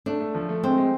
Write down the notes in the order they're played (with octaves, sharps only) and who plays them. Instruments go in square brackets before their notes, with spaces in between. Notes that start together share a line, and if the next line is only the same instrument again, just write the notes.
[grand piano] A3 [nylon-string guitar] D4
[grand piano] A3
F3
A3
[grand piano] G#3 [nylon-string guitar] C4
[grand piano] G#3